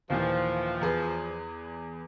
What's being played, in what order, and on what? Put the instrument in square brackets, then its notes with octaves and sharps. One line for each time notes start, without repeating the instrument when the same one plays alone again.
[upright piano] D#2 A#2 E3 [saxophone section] F3
[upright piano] E2 G#4 B4